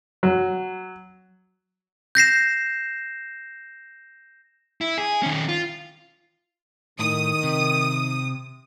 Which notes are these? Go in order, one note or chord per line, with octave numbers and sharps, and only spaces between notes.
F#3
G6 A#6 C7 E7
E4
G#4
D#3 C#4
F4
A2 D#3 D#6
C3